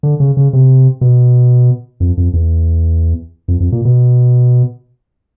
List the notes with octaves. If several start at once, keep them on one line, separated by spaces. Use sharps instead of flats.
D3
C#3
C#3
C3
B2
F2
F2
E2
F2
F2
A#2
B2